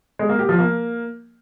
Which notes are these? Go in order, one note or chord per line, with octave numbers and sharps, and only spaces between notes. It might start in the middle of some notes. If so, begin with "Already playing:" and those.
G#3
A#3
G4
F3
A#3